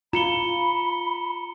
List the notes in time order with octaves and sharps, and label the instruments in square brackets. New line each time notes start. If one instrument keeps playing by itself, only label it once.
[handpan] F4 [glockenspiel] A#5 C#7 G7 [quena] B5